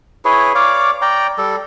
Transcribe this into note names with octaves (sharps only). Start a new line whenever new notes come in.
E4 G#4 B4 C#5
C#5 D5 F5 D6
D5 G5 A#5
G3 A4